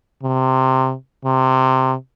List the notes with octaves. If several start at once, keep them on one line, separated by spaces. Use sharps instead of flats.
C3
C3